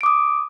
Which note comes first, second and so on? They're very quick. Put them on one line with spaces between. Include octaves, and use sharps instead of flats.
D7 D6 D#6